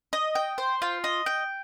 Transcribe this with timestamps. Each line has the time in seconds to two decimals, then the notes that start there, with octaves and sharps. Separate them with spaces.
0.13 D#5
0.35 G5
0.58 C5
0.82 F4
1.04 D#5
1.26 G5